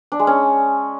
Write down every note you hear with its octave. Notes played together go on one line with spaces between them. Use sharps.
D4
G#3
C#4